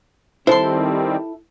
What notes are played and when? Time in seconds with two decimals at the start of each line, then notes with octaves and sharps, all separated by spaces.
0.47 D#3 G3 C4 E4 A4 C5 C6